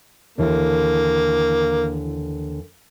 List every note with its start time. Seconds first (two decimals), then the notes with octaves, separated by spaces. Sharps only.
0.38 D#2 D3 E3 A#3